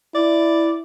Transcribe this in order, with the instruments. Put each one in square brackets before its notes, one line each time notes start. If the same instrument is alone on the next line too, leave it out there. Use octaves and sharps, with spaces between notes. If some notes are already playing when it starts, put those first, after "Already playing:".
[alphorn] E4 [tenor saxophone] D5